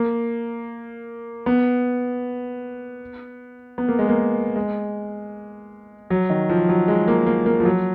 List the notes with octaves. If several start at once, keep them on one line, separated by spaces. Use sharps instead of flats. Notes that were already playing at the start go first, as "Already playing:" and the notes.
Already playing: A#3
B3
B3
A#3
G#3
A#3
G#3
F#3
D#3
F3
F#3
G#3
A#3
A#3
A#3
F3
F#3